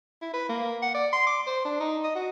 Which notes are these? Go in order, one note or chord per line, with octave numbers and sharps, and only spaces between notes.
E4
B4
A#3
F#5
D5
C6
D6
C5
D4
D#4
D#5
F#4